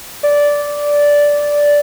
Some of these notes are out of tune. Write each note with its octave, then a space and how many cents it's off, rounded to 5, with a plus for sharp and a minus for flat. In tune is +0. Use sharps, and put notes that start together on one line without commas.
D5 -10